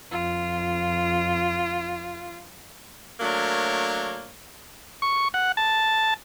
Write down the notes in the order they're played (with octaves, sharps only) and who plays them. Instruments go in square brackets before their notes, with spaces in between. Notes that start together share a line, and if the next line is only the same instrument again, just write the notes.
[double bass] F2 [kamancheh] F4
[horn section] F#3 A3 A#3 D4 A#4 C#5
[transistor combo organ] C#6
F#5
A5